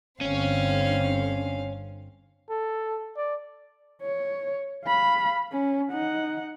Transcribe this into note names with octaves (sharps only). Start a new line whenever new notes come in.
G1 D3 C4 C#4 C#5 F5
A4
D5
C#5
F5 B5
C#4
D#4 F#5